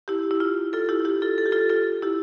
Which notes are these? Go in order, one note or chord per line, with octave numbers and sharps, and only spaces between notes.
E4 G4
E4
F4
F4 A4
E4 G4
E4 G4
F4 A4
A4
G4
F4 A4
F4 A4
E4 G4